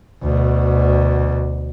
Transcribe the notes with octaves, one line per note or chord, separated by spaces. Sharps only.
D2 B2